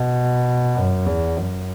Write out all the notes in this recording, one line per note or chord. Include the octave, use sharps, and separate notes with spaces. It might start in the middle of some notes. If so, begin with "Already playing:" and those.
Already playing: B2
F#2
E2
F#2